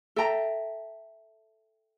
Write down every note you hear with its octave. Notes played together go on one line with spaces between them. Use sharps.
A4 E5 G5 A#5